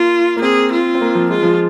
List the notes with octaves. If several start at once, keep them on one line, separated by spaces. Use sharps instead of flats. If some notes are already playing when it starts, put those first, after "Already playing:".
Already playing: A#3 F4
A#3
C4 G#4
F4
C4
A#3
F3
G#3 F4
F3